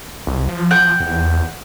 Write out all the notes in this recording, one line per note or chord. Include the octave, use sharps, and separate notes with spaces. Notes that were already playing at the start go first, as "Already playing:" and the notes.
C2
F3
F#5 G5
E2